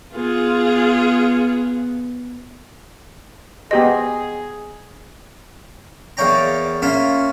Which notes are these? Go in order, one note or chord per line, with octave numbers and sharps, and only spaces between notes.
B3 F4 G#4
B3 G4 G#4 C5 D#5
E2 A#3 C#5 D5 G5 A#5
A#3 C#4 F4 E5